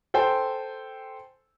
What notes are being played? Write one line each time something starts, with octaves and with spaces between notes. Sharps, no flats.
A4 C5 G5 G#5 C6